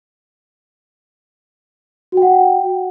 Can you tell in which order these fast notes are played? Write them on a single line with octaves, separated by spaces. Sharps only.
F#4 G5 F#5